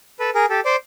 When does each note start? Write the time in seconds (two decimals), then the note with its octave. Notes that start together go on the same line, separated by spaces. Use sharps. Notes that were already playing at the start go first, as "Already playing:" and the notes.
0.19 A4 B4
0.35 G#4 A#4
0.50 G4 A4
0.65 C5 D5